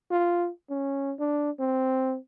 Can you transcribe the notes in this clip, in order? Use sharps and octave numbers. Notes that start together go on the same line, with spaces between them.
F4
C#4
D4
C4